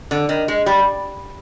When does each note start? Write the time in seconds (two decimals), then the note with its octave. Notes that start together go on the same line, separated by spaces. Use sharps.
0.11 D3
0.29 D#3
0.48 G#3
0.66 G3